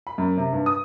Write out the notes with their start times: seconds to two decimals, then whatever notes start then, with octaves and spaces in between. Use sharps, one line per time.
0.07 B5
0.18 F#2
0.37 C3
0.53 G2
0.66 D#6